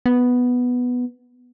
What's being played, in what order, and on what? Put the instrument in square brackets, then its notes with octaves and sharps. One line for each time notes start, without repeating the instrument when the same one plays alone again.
[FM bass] B3